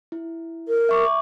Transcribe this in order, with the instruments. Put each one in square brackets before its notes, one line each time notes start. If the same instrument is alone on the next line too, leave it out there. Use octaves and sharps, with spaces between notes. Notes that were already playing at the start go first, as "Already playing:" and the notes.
[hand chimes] E4
[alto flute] A#4
[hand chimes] E5 C#6 D6